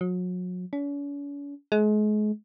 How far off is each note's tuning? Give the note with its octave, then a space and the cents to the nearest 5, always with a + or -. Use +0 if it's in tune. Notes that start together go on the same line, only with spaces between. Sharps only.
F#3 -35
C#4 +45
G#3 +35